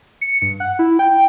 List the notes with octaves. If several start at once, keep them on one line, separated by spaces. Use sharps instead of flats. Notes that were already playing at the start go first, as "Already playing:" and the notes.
C#7
G2
F#5
E4
G5